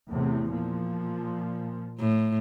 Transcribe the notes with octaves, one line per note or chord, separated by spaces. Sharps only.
E2 A2 C3
A#2 F3
A2